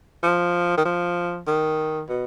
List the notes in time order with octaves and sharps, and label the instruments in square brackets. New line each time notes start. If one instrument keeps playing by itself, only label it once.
[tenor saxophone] F3
D#3
F3
D#3
B2